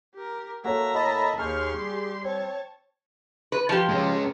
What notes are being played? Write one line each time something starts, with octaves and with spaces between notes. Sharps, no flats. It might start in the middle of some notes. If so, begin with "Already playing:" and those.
G4 A#4
A#3 F#4 A4 C#5 E5 A#5
A2 D#5 A5 B5
D#2 G4 G#4 G#5 C6 C#6 F6 G6
G3
C4 C#5 A5
B4
F3 G4
G#3 C#4